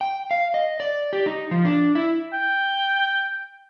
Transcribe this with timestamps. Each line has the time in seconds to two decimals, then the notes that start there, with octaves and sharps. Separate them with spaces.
0.01 G5
0.31 F5
0.54 D#5
0.80 D5
1.13 G4
1.26 D#4
1.51 F3
1.65 D4
1.95 E4
2.33 G5